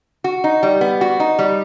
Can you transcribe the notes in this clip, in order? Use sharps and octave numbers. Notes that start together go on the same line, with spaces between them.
F#4
D#4
G3
B3
F#4
D#4
G3